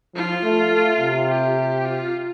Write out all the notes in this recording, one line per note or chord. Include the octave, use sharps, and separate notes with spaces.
F3 F4
A3
A3
C3
G4
F4